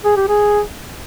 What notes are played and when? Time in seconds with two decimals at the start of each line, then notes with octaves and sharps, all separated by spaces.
0.05 G#4
0.17 G4
0.28 G#4